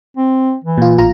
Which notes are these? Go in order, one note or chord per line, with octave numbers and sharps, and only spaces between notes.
C4
E3
A#2 F4
A1 F4 A#5